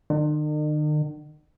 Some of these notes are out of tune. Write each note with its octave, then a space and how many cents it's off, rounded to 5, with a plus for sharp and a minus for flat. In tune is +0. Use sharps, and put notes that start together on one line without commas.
D#3 -45